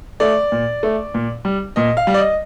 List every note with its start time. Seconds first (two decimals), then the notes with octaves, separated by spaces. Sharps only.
0.20 A3 D5
0.52 A#2
0.83 A3
1.14 A#2
1.45 G3
1.76 A#2 D#5
1.97 F5
2.07 G3
2.14 D5
2.18 D#5